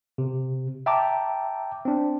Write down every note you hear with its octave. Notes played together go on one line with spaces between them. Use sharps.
C3
E5 G5 A5 A#5 D6
C4 D4